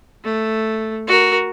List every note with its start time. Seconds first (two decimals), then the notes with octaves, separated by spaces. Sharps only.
0.24 A3
1.07 F#4 A#4